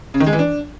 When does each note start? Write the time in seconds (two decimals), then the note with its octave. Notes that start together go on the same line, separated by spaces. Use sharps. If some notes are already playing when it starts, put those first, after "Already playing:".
0.14 C#3
0.20 D#3
0.27 G#3
0.33 E3
0.39 D4